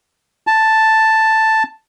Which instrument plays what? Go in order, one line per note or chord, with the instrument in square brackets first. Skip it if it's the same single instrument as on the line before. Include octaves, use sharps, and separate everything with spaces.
[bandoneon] A5